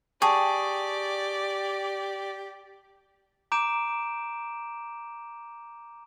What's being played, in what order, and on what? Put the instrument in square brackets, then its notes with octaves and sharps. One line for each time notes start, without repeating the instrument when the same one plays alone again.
[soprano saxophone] G4 [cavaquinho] G#4 [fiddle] D5 [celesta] G5 A5 C#6
[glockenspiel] A#5 D6 G6 D7 E7